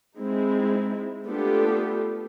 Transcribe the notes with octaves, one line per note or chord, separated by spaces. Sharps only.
G#3 C4 D#4 E4
A3 B3 D4 F4 G4 A4